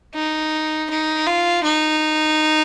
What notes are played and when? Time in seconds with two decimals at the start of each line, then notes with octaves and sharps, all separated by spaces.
0.15 D#4
0.90 D#4
1.26 F4
1.64 D#4